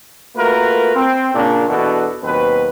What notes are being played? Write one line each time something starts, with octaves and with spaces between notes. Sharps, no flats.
A3 A#3 F4 F#4 A#4 B4
C4
A#2 C#3 A#3 C#4 D4
E2 B2 D4 F#4 A4 B4
D#2 B2 F#3 C4 B4